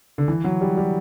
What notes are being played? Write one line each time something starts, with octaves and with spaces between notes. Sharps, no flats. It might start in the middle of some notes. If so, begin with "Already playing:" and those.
D3
E3
F#3
G3
G3